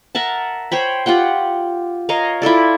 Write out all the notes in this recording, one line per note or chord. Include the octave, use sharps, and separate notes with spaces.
A#4 E5 F#5 A5
C5 C#5 G5 B5
F4 G4 F#5 G5
A#4 C#5 D#5 F5
E4 F4 A4 D5